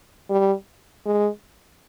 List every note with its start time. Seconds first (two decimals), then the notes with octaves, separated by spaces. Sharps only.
0.30 G3
1.06 G#3